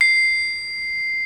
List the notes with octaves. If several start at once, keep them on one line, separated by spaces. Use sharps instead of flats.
C7